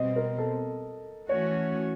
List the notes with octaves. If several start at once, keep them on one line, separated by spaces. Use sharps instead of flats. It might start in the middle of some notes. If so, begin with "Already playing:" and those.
Already playing: B2 G3 C4 D#5
A#4
A4
E3 A3 C#4 F#4 C#5